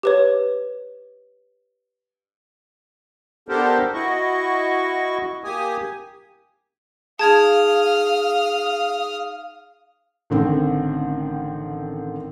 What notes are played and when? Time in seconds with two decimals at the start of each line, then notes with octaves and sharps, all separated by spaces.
0.03 G4 B4 C#5
3.49 B3 D4 G4 A4 A#4 C5
3.94 E4 F#4 D#5 C#6
5.44 A#3 G4 G#5 D#6
7.19 D#4 G#4 F5 A5 D#6 F6 G#6
10.30 A1 D3 D#3 C4